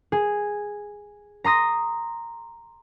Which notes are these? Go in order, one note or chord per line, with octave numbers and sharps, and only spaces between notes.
G#4
A#5 C6 D#6 A#6